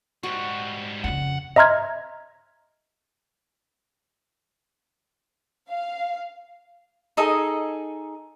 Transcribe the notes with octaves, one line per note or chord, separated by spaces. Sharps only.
G#2 G3 F#4
F2 C#3 F#5
D#5 E5 A#5 C6 F6 G#6
F5
D#4 G#4 A4 D#5